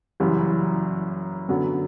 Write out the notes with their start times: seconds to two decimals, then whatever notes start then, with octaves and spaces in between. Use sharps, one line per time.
0.20 F#1 F#2 E3 G3
1.49 F#2 D3 F#3 B3